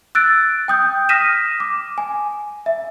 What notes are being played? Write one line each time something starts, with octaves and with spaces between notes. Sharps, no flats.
E6 F#6 A6 D7
G5 D#6 G6
D#6 F6 A#6 B6 D#7 E7
D6
G#5
E5